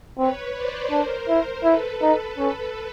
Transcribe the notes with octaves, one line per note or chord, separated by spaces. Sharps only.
C4 B4 C#5
C5 D5
D4 A#4 C5
E4
E4 A4 B4
D#4 A4 B4
C#4